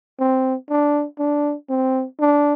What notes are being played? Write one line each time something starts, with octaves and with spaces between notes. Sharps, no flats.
C4
D4
D4
C4
D4